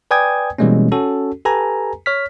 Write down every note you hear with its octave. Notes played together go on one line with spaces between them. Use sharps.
B4 D5 G5 G#5 D#6 G#6
B2 E3 G3 G#3 A#3 C#4
C#4 F#4 A4
G4 A4 B4 G#5 A#5
C#5 F6 B6